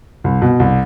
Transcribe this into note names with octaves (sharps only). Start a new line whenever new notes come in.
C2
B2
C2